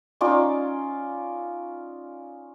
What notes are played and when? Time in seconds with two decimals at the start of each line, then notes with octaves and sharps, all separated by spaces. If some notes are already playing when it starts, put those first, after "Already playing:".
0.21 C#4 D#4 F4 D5